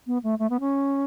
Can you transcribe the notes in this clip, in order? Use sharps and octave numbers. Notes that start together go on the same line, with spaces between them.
B3
A3
A3
B3
C#4